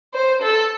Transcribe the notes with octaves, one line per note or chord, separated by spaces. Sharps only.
C5
A4